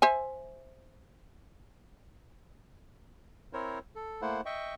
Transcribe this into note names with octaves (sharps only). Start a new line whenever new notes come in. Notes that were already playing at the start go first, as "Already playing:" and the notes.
C5 E5 G#5
C4 E4 A#4 C5 C#5
A4
A3 A#3 E4 C5 F#5
D#5 E5 G5 C#6